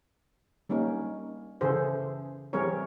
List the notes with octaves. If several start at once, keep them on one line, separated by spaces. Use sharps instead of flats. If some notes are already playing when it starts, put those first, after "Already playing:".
G3 A#3 C#4 D#4 A#4
C#3 E3 G#4 A4 C5
E3 G3 C4 G#4 A#4 C#5